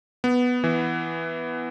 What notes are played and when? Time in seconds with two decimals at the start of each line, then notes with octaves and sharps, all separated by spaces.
0.24 B3
0.64 E3